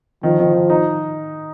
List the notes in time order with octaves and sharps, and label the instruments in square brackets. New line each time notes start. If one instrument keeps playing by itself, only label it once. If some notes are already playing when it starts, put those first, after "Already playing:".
[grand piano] D#3 [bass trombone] F3
[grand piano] D#3
D#3
D#4